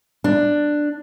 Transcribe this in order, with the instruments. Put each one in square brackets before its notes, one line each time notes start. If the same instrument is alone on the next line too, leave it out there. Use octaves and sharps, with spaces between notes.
[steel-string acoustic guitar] D4